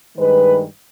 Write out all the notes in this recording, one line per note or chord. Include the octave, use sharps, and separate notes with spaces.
G2 D#3 G#3 B4